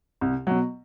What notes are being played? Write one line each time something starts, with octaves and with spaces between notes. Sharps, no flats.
C2
B2 F#3